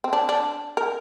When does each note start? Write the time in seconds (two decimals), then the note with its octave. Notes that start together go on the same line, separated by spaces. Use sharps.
0.04 C4
0.13 D4
0.29 D4
0.77 A#4